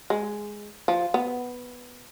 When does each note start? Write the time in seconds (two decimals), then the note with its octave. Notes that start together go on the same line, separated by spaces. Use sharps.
0.10 G#3
0.88 F3
1.14 B3